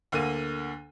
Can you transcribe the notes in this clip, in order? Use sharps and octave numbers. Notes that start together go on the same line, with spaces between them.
D2 D3 A#3 D#7